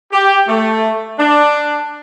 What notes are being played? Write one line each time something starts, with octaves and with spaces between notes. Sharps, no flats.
G4
A3
D4